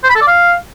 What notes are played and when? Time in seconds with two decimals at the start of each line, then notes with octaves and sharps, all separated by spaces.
0.04 C5
0.10 B5
0.16 A4
0.21 D5
0.27 F5